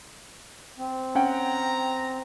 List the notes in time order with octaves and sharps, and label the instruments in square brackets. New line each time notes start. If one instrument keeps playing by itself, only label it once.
[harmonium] C4
[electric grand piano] C#4 F#5 G5 [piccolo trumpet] A#5